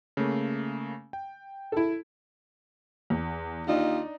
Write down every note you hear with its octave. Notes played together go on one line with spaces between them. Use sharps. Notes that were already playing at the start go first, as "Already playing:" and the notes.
C#3 A3 A#3
G5
E4 A4
E2
D#2 D4 D#4 F4 D#5